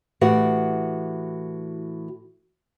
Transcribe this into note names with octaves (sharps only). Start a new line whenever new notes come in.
A2 E3 F#4 G4 B4 F#5